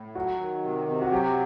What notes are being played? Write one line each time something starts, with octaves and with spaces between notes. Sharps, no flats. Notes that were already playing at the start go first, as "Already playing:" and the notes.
Already playing: A2
F#3 F#4
D#3
C3
C3
F#4
F#3 G4